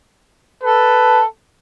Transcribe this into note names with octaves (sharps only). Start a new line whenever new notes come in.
A4 B4